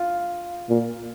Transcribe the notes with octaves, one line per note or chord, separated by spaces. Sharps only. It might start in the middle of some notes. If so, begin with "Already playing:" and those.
Already playing: F4
A#2